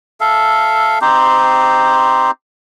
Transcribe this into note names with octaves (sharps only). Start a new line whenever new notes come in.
A4 E5 F5
C4 D#4 G4 C5